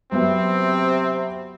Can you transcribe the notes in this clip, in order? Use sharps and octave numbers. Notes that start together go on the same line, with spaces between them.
C3 F#3 B3 C4 E5